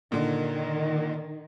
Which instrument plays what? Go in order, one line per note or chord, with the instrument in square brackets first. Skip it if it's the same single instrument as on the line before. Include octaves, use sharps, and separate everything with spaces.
[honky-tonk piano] A#2 D3 [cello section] D#3